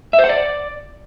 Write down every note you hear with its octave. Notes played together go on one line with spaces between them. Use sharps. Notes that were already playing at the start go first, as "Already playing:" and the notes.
E5
C5
F#5
D5